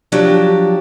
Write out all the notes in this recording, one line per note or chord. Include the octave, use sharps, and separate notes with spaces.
F3 F#3 D4 G4